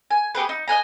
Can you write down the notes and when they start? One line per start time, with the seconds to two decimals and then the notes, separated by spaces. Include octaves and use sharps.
0.11 G#5
0.35 B3 G4 G#4 B4
0.49 D#4
0.68 D#5 F#5 G#5 A#5